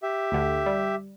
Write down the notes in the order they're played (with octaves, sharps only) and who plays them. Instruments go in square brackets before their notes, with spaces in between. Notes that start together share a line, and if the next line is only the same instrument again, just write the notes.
[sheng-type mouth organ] G4 E5
[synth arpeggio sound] D2 D3
G3